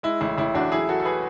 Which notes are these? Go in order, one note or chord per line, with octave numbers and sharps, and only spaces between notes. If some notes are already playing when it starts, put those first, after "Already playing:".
G#3 E4
A1 E4
A1 E4
A1 D4 F#4
F#3 E4 G#4
F#3 F#4 A4
A4
G#4 B4